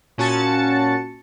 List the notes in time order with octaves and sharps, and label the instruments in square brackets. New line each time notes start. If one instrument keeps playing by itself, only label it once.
[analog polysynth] A#2 C#4 F#4 A5 A6 C#7